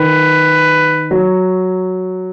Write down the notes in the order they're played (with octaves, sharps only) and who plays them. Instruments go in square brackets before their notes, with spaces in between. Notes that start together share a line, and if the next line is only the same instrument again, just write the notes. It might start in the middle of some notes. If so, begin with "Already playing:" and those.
Already playing: [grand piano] D#3 [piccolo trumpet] B4
[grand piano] F#3